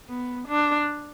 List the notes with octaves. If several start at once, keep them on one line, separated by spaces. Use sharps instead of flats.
B3
D4